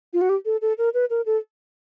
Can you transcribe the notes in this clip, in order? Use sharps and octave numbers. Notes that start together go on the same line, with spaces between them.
F4
F#4
G4
A4
A4
A#4
B4
A#4
A4